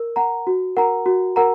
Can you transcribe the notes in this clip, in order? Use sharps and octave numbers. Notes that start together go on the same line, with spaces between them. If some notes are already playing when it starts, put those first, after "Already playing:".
Already playing: A#4
F#5 A#5
F#4
A#4 F#5 A#5
F#4
A#4 F#5 A#5